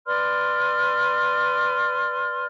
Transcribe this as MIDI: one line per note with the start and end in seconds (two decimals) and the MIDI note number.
0.06 2.45 71
0.06 2.45 74
0.06 2.45 84
0.06 2.45 89